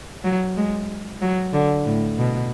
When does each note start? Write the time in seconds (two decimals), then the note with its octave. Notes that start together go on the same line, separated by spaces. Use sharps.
0.24 F#3
0.57 G#3
1.21 F#3
1.53 D3
1.85 A2
2.18 B2